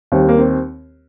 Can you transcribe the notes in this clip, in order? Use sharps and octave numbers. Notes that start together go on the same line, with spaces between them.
D#2 D#3 G3 C4
A#3
C4